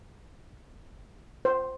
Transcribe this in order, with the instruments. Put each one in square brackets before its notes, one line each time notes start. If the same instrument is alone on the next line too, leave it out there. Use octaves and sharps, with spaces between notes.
[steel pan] C5